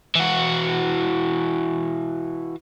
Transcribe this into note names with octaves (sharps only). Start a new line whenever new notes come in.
E3 F#4